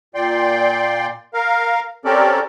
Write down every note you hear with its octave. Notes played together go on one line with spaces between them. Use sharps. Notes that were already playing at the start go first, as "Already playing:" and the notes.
A#2 D5 G5 C6
A#4 F5
C4 C#4 G4 A4 A#4 D5